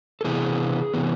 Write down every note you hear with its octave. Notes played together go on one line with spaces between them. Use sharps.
A4
C3 E3 B3 G#4
C3 E3 B3